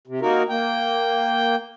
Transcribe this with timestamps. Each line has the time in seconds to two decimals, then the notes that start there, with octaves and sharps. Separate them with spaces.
0.07 C3
0.22 A#3 D#4 F#4 A#4
0.49 A#3 G5